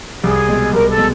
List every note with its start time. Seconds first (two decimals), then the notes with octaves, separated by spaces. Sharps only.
0.23 C2 G#4
0.48 B2 G#3
0.73 C2 A#4
0.89 A4
0.97 B2 G#3